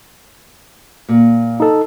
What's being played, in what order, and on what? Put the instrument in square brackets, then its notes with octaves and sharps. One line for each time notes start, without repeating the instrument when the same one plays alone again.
[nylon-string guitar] A#2
[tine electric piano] D#4 A4